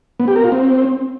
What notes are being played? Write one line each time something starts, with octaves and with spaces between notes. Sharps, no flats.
B3
G4
A#4
F4
C4